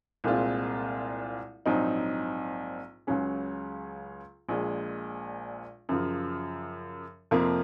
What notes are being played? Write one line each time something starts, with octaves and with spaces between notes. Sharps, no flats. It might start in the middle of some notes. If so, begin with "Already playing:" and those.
C2 A#2 G#3 C4 F4
A#1 G#2 F#3 C4 D#4
C#2 C#3 F#3 C#4 G#4
A#1 A#2 G#3
F#2 C#3 F3
F2 C3 F3 A#3